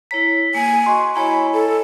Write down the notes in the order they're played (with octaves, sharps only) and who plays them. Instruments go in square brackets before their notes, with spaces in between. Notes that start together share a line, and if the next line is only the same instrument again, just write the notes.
[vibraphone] E4 C#5 A#5 [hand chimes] B6
[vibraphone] A#3 [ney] G#5
[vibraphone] F#4 D#5 [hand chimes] C6 C#6
[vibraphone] E4 C#5 D#5 [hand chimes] G#5 A#5 [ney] B5
[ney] A4